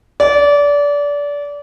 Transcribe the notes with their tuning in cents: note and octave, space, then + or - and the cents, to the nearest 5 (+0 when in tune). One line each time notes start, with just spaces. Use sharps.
D5 -25